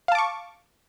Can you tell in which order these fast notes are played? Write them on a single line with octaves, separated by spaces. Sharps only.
F5 A5 D6 C#6